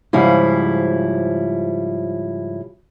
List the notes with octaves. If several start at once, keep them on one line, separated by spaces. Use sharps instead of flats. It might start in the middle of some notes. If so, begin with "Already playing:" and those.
G#2 C#3 F3 G3 E4